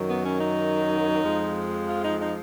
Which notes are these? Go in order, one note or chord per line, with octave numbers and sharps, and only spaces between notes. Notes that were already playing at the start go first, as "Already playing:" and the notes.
Already playing: F#2 D#3 F#3
B3
C#4
D#4
F2 F3 G#3
F4
D#4
D#4